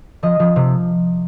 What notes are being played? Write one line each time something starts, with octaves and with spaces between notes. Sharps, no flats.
F3 D#5
F3
C3